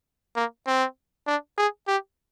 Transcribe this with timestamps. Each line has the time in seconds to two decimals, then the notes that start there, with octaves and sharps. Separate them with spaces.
0.36 A#3
0.67 C4
1.27 D4
1.58 G#4
1.87 G4